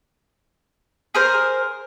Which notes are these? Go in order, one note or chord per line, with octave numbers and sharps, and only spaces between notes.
G#4 A#4 C5